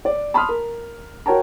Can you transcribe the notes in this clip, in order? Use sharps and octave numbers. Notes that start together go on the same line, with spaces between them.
D5
A5 B5 C6 D#6 F6
A#4
F#4 A#4 C#5 G5 A5 A#5